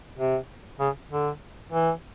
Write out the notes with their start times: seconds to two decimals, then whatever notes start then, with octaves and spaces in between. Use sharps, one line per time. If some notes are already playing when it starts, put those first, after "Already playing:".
0.18 C3
0.80 C#3
1.11 D3
1.72 E3